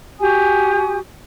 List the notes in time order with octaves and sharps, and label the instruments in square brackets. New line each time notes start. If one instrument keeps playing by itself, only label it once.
[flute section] F#4 G4 G#5 D#6